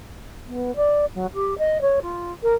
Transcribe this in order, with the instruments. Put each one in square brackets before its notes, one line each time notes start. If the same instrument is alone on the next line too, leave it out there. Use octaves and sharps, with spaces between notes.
[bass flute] B3
D5
F#3
G4
D#5
C#5
F4
A#4